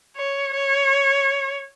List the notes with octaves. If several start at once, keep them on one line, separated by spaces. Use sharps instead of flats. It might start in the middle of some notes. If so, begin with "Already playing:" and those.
C#5
C#5